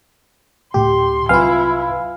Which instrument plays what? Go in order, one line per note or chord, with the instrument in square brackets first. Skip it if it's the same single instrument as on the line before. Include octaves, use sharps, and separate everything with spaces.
[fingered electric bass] D2 A2 A3 [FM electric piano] G4 [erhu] C6
[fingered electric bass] C2 F#3 C4 [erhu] E4 [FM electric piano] F4 F5 [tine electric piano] B4 G#5